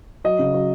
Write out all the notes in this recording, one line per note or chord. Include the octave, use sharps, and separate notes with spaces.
F#3 D#5
C#3
F#3